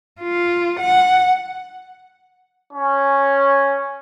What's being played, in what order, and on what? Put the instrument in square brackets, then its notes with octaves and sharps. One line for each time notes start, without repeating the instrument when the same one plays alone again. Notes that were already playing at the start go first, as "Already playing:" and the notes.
[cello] F4
F#5
[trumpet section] C#4